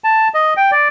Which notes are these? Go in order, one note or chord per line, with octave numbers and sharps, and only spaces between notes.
A5
D#5
G5
D5